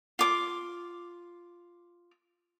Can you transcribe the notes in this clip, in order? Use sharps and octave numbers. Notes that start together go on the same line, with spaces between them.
F4 D6